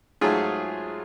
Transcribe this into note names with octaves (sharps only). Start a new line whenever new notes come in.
G#2 F#3 A3 F4 G#4